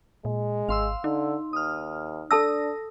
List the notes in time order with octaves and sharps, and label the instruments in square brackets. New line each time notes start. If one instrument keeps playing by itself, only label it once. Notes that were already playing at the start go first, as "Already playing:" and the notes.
[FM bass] A#2 [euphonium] G#3
[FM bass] G#1 [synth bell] F5 C6 E6
[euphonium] D3 [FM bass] D#4
[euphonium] D#2 [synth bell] D#6 F6
[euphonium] D4 [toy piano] A4 A5 E6 [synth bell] D#6 A#6